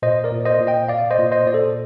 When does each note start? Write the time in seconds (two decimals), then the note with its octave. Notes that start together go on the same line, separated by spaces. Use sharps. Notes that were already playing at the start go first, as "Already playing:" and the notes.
0.02 A#2 C5 D#5
0.24 A#4 D5
0.32 A#2
0.45 C5 D#5
0.60 A#2
0.67 D#5 G5
0.88 A#2 D5 F5
1.11 C5 D#5
1.18 A#2
1.31 C5 D#5
1.47 A#2 D5
1.54 A4 C5